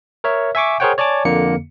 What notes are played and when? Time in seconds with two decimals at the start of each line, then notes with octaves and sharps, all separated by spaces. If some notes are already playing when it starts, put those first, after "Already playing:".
0.24 A#4 C#5 E5
0.55 E5 G#5 C#6 D6
0.80 G#4 A#4 C5 C#5 F#5 G5
0.98 C#5 D5 G#5 A5 D6
1.25 F2 D3 A#3 C#7